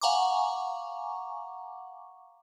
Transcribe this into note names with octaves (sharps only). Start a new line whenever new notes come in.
F5 F#5 G#5 A#5 C#6 D6